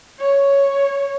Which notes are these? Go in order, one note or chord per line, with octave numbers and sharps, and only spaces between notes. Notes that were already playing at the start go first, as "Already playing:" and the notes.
C#5